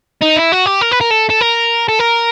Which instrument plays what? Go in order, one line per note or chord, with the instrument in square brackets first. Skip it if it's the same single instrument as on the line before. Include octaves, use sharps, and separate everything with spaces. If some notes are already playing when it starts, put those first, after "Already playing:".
[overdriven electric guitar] D#4
E4
F#4
G4
A#4
B4
A#4
A4
A4
A#4
A4
A#4